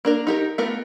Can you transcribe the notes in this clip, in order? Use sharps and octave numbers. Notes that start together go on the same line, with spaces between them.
A#3 D4 A#4
D#4 G4 A#4
A3 B3 F4 G4 A#4